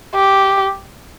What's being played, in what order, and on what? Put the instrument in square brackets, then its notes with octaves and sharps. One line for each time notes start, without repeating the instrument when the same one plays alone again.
[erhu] G4